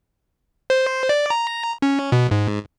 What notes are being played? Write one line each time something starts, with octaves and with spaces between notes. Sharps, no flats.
C5
D5
A#5
C#4
B2
G#2